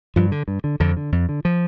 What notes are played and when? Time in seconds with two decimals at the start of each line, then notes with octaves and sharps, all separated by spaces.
0.16 G2 F3
0.32 D3
0.48 G2
0.64 D3
0.80 F2 D3
0.97 D3
1.12 F2
1.29 D3
1.45 F3